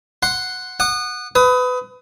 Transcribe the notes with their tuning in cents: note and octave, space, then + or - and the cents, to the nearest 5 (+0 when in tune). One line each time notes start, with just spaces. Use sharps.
F#5 +0 C6 +0
F#5 +0 D#6 -30
B4 +25 D#6 +25